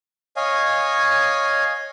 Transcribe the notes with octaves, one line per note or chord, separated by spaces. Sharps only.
C#5 D#5 F5 G#5